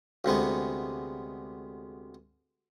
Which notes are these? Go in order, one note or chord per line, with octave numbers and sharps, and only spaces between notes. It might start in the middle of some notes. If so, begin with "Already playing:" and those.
D2 C3 G#3 B3